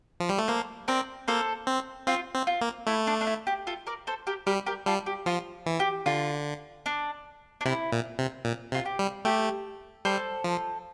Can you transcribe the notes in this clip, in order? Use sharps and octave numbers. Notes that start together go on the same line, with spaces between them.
F3
G3
A3
A#3 A4 C5
C4 A#4 D5
A#3 A4 C5
C4
C4 F4
C4
F4
A#3
A3 E4
D4
D4
E4
G4
F4 A4
A#4 D5
A4 C5
G4 A#4
G3 G4 A#4
G4 A#4
G3 F4 A4
G4
F3 F4
E3
G4
D3 F4
D4
D4
C3 E4
A#2
C3
A#2
C3 F4
G4
G3
A3 G4
G3 A4 C5
F3